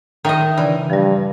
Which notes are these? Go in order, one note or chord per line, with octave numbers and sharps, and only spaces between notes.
D#3 A#4 D#5 E5 A#5
C#3 E3 D4
G2 F3 G3